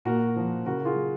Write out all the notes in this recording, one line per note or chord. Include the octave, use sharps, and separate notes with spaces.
A#2 F#4 A#4
F3
C#3 F#4 A#4
F4 G#4
F#3